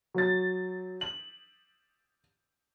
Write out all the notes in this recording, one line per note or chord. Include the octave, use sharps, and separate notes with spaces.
F#3 A6
F#7